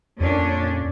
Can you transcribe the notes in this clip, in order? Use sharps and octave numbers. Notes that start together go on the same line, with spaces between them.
F2 A#2 C#4 D4